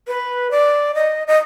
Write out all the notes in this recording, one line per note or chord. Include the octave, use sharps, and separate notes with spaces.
B4
D5
D#5
D#5